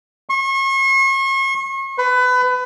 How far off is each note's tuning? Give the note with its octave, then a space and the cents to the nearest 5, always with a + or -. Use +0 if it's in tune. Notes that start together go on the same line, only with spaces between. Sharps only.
C#6 -40
B4 +25